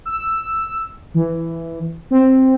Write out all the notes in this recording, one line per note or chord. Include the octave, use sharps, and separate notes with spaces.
E6
E3
C4